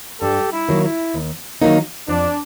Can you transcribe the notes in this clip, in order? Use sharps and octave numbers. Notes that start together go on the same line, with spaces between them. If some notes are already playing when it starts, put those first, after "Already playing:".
G2 G4 A4
E4
D#3 F#3 A#3
E4
D#2
D#3 F#3 A#3 D#4
F2 D4